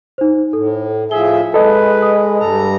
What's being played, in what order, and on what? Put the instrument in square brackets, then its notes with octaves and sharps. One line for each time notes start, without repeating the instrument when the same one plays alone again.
[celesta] D#4 C5
[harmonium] A2 [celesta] A4
[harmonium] A2 F3 E5 [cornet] G#4 [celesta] G7
[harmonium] G#3 [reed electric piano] A4 D#5 [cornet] B4
[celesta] D#6
[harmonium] G2 G3 A#5 [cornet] A4